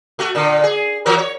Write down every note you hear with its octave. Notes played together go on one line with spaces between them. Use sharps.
A3 F#4
A#2 D3
G#4
E3 F#3 A#4
C#5